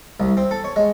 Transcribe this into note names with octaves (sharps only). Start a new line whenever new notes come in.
C2
C4
A4
C#5
G#3